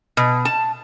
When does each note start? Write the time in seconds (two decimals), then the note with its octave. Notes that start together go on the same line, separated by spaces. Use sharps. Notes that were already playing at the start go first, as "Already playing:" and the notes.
0.17 B2
0.45 A5